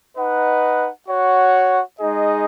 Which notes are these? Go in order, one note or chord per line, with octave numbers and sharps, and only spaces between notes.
D#4 B4 D#5 F#5
F#4 C#5 F#5
G#3 D#4 G#4 D#5